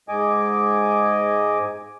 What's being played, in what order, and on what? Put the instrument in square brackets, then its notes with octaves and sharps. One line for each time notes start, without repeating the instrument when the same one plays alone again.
[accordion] G#2 D#5 G#5 D6